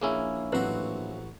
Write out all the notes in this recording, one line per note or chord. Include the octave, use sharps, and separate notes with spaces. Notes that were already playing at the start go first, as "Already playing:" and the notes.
A#1 A#3 C#4 E4 G#4 G#5
A1 F#3 C4 F#4 B4